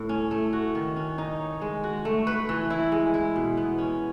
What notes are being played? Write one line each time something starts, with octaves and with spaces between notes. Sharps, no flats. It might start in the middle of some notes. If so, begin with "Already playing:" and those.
Already playing: A2
C#4
A3
F#4
D#3
C#4
D#4
C#5
G#3
F#4
A3
B4
E3
E4
G#3
E4
B2
B3
C#4